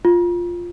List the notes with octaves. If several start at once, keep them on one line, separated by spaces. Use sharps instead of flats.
F4